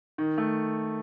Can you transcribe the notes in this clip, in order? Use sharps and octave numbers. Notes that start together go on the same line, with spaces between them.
D#3
A3